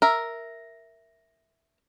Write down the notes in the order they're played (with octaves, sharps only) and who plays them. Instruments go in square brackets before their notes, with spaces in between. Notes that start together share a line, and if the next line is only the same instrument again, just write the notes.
[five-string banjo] A#4 E5